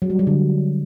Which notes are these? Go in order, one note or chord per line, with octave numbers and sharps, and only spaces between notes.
F#3
G3
F#3
D3